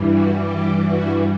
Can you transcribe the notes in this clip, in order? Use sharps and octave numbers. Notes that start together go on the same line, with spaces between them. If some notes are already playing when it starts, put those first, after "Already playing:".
Already playing: G2 E3 G3
F#4
G4
F#4